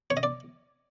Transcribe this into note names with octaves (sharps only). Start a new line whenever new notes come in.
C#5
D#5
D5